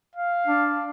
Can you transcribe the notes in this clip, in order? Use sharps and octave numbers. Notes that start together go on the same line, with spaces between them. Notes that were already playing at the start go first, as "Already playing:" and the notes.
F5
D4